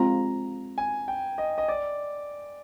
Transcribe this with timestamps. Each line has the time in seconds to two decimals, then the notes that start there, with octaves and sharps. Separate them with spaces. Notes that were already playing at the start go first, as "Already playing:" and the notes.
Already playing: G#3 C4 F4 A#5
0.78 G#5
1.08 G5
1.38 D#5
1.58 D#5
1.68 D5